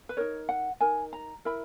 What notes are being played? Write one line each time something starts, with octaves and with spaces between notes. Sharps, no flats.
B4
D#4 A#4 C#5
F#5
D#4 A#4 G#5
A#5
E4 A#4 B5